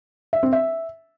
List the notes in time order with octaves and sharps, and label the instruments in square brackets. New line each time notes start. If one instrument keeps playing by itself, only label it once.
[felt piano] E5
C4
E5